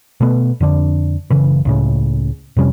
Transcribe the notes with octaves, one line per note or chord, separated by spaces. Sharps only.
B2 A3 B3
F2 D3 D4
F#1 C#3 E3
C#2 A2 C#3
F2 C3 G3 C#4